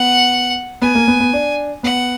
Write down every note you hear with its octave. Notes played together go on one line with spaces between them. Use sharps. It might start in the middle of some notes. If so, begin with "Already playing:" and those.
Already playing: B3 F#5
B3 G#5
A#3
B3
B3
D4
B3 F#5